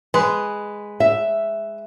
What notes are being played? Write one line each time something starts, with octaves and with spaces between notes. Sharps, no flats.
G#3 B4
E5